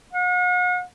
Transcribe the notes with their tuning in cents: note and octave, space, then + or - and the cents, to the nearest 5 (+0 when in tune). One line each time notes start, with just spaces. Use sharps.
F#5 -45